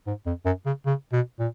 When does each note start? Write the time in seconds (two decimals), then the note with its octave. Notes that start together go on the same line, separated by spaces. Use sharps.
0.07 G#2
0.26 F2
0.46 F#2
0.66 C#3
0.86 C#3
1.12 B2
1.39 A#2